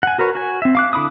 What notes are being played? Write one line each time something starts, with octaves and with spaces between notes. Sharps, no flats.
F#5 G#5
F#4 A#4 B4 C#5
F#4 G#5
C4 E5
F5 D6 F#6
D3 E4 B5 D6 D#6